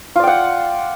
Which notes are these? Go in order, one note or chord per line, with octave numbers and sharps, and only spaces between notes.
F4 D5 F#5 G5